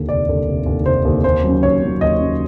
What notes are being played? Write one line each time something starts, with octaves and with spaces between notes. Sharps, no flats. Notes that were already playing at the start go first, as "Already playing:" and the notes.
Already playing: D#2 D3
F1 D5
D#2 D3
F1
D#2 D3
F1 C5
D#2 D3
D#2 C5
C#3 F#3
D#2 C#5
C#3 F#3
D#2 D#5
C#3 F#3